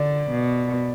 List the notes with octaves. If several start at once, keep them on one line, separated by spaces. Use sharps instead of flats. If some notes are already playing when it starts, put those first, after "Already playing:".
Already playing: D3 D5
B2